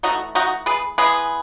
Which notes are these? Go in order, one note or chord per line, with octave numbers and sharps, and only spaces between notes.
E3 A3 D#4 F#4
D#4 F#4
G#4 B4
E3 G#3 B3 G#4 B4